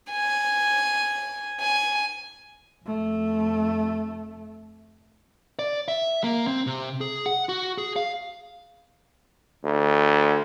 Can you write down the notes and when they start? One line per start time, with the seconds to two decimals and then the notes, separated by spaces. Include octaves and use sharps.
0.11 G#5
1.61 G#5
2.85 F1 A3
5.59 D5
5.88 E5
6.24 A#3
6.47 C4
6.67 C3
7.01 G#4
7.26 F#5
7.49 F#4
7.78 G#4
7.96 F5
9.64 D2